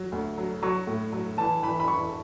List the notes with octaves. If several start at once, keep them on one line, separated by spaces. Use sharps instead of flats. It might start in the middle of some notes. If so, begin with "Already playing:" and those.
Already playing: F#3
D2
F#3
F#3 C#6
A2
F#3
E3 A5
E3 B5
B5
E3 C#6